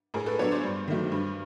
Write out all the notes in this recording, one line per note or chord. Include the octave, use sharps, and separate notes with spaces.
A2 G#4 A#4
A4 B4
F#3 B3 D4 B4 C#5
C5 D5
G2
D#3 F#3 A3
G2